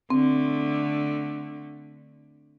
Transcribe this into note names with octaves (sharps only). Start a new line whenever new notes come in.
D3 A3 C4